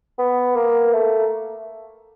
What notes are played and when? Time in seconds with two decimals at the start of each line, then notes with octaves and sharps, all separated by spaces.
0.19 B3
0.56 A#3
0.93 A3